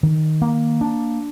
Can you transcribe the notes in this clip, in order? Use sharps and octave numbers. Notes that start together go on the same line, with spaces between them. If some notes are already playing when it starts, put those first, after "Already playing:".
D#3
A#3
D4